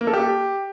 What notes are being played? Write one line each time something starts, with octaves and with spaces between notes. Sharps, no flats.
A#3
A4
G4